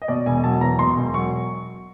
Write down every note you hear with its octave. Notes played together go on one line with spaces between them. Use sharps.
D#5
B2 D5
E1 G#5
F#3 A5
E2 A#5
B2 C6
E1
F#3 C#6